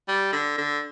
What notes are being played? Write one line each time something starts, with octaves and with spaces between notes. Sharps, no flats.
G3
D3
D3